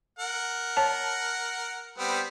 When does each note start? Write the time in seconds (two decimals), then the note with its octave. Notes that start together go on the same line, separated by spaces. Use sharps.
0.19 A#4 F#5
0.77 C#5 A5
1.98 G3 B3 C4